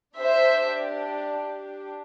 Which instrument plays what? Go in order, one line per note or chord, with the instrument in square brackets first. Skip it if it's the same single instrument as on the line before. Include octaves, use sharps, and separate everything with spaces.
[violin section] D4 G4 C5 E5